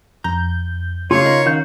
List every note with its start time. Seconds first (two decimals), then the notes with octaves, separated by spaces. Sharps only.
0.24 F2 A#5 G6
1.11 C#3 A3 F4 G4 C#5 F5
1.24 D#4 A#4
1.46 D#3 C#4 F#4 F5 G6